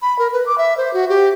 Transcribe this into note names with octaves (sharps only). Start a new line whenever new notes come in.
B5
A#4
B4
D6
E5
C5
F#4
G4